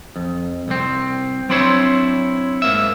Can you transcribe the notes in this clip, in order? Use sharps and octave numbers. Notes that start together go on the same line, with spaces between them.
F2
C2 C4
F#3 C4 D4 E4 C5 C#5
G#2 A#3 E5